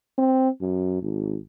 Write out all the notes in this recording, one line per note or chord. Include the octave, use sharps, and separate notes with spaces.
C4
F#2
G#1